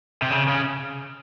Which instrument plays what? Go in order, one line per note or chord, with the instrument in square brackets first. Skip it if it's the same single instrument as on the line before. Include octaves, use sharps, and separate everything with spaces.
[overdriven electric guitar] C3
C#3
C#3